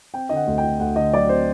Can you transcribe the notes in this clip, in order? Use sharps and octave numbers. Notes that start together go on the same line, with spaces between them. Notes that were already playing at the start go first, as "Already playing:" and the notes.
C4 G5
D3 D#5
F#5
D2
G5
D3
D2 F#5
D3 D#5
F#3 D5
C4 C5